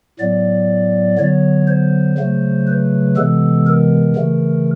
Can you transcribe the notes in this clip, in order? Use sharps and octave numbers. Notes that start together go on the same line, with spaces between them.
A2 F#3 B3 D5
D3 F#3 B3 C#5
C5
C#3 F#3 A3
B4
C3 E3 G#3 B3 A4
A#4
C#3 E3 A3